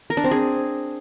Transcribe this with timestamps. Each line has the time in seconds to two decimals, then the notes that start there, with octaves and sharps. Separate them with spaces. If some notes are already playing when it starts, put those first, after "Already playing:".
0.10 A#4
0.17 D4
0.24 C4
0.31 G#4